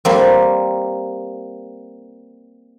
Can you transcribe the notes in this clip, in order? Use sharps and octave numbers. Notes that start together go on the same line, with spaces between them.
G3 A#3 C4